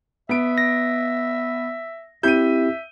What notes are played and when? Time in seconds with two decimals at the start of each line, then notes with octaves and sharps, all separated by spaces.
0.29 B3 E5 D7
0.58 A#6
2.23 C4 E4 G4 E5 G6 D#7